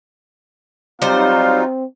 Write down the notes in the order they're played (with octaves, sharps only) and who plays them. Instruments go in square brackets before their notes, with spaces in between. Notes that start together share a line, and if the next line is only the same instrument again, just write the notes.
[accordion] F#3 D#4 F4 [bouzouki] G3 C5 [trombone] C4 [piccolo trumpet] F5